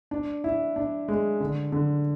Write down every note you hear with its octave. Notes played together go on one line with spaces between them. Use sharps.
D4
E4
D4
G#3
D3
D3